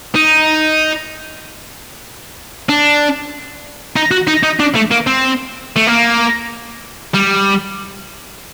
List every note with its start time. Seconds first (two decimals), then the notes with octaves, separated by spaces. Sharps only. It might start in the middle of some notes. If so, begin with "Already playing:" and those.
0.15 D#4
2.69 D4
3.96 D#4
4.11 F#4
4.28 D#4
4.43 D#4
4.60 D4
4.75 A3
4.91 A#3
5.07 C4
5.76 A3
5.87 A#3
7.14 G3